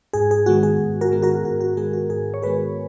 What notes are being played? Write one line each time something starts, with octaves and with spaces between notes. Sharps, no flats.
G#2 G#4
G#4
D#3 G#3 B3 F#4
G#4
G#2
F#4 A#4
D#3 G#3 B3
F#4 A#4
G#2 F#4
F#4
D#3 G#3 B3 G#4
F#4
G#2 G#4
C#5
D#3 G#3 B3 G#4 B4